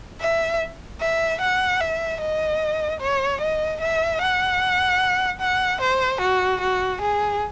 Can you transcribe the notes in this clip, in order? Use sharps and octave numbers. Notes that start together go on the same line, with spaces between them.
E5
E5
F#5
E5
D#5
C#5
D#5
E5
F#5
F#5
C5
F#4
F#4
G#4